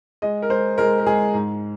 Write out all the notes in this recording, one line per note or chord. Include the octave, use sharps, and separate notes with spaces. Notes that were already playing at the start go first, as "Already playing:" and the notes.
G#3 D#5
A#4
G#3 C5
G#3 A#4
A#4
G#3 G#4
G#2